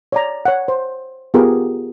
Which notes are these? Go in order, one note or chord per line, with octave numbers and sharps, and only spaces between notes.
C#5 D5 A#5
C#5 F#5
C5
B3 F4 G4 G#4 A#4